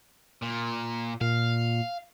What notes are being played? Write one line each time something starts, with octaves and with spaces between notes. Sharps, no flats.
A#2
A#2 F5